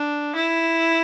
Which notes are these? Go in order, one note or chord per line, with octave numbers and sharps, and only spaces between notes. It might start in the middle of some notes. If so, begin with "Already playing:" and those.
Already playing: D4
E4